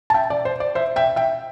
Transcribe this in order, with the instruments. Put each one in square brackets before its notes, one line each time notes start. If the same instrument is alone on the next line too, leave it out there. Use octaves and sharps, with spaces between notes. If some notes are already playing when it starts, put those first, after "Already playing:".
[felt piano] A5
E5 G5
D5
C5
D5
C5 E5
E5 G5
E5 G5